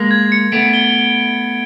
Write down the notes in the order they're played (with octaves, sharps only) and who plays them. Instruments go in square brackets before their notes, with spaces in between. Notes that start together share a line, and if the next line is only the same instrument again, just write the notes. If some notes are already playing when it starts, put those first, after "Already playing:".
Already playing: [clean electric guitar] G#3 A#3
[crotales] G#6
C#7
[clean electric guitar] A3 B3 [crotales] D7
[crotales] G7